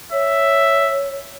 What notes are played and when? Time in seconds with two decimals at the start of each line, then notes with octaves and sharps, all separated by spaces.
0.12 C#5 E5